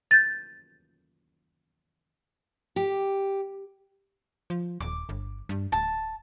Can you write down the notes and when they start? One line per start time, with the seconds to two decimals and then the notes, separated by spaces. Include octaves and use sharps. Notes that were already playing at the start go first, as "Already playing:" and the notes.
0.11 G6 A6
2.76 G4
4.50 F3
4.80 D#1 D6
5.09 G1
5.49 G2
5.72 D1 A5